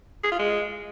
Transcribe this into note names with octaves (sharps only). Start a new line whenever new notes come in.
G#4
F4
G#3